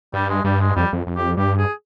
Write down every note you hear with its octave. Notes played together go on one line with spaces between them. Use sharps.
G2 G3
G#3
G2 G3
G#3
F2 G3
F2
F2
G4
G2 G4
G#4